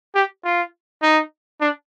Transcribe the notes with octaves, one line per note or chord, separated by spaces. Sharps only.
G4
F4
D#4
D4